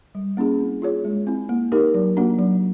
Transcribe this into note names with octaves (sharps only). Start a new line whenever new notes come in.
G3
A#3 C#4 E4 G#4
C4
F4 G#4 C#5
G#3
C4 E4
A#3
D#4 G4 A#4
F#3
A#3 D4 F#4
F#3